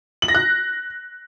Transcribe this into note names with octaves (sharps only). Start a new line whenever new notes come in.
F#7
A#6
F#6